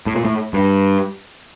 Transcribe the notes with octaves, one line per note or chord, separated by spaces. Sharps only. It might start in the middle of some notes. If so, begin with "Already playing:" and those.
A2
A#2
A2
G2